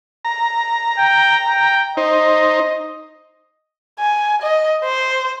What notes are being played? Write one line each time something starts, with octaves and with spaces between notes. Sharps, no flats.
A#5
G5
G5
D#4 C5 D#5
G#5
D#5
C5